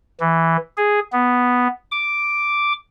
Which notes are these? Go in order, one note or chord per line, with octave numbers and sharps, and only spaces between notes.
E3
G#4
B3
D6